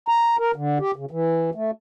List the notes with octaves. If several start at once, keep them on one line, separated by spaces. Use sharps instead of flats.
A#5
A#4
D3
G4
C#3
E3
A3